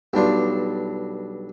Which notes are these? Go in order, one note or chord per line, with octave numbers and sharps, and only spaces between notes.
B1 G2 D4 F4